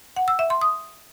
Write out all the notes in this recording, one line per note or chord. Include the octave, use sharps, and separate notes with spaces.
F#5
E6
E5
C6
D#6